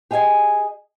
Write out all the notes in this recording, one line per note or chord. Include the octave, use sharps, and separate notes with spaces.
G4 G#4 D#5 E5 G#5